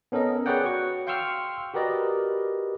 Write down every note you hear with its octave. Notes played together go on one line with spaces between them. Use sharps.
B3 C#4 A4 A#4 D#5
G#4 B4 C#5 D5 F#5 G5
F#4 C#6
F5 G5 C6 C#6 E6 F6
F#4 G4 A#4 B4 D5 D#5